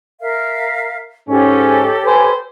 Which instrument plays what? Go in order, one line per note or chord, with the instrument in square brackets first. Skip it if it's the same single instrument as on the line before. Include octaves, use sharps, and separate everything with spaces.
[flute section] A#4 E5 F5
[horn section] G#2 C#4 [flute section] G4 A4 C#5
[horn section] B4 C5 G#5